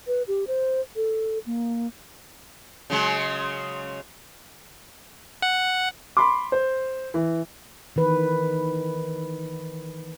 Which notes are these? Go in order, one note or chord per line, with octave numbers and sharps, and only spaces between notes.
B4
G4
C5
A4
A#3
C#3 F#3 G#3
F#5
B5 C6 D6
C5
E3
D#3 E3 B4